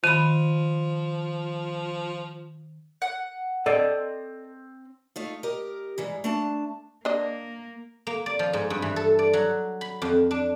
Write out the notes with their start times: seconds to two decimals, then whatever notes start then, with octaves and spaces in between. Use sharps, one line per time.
0.04 D#3 F3 B5 D#7
3.02 F#5
3.66 C4 A4 D5 D#5
5.16 A3 D#4 F4
5.43 G4 A#4 D#5
5.98 G#2 E3 G3 G#3
6.24 A3 D4 A5
7.05 A#3 D4 D#5
8.07 A#3
8.26 D5
8.39 F3
8.53 G#2
8.70 G2
8.82 E3
8.96 A4
9.19 D5
9.33 F#3
9.81 B5
10.02 F2
10.31 D4